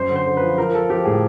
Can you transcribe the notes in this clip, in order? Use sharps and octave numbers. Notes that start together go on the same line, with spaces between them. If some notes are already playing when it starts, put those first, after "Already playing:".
Already playing: F#2 C5
D3
C5
D3
F3 B4
F3 A#4
F3 A4
F3 G4
A2 G#4